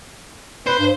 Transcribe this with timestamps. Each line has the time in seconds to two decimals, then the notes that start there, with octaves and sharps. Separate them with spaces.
0.67 B4 C5
0.79 G2